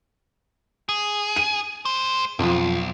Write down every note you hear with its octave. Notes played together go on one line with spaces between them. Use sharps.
G#4
D#7
G#3 C5
B1 F2 F3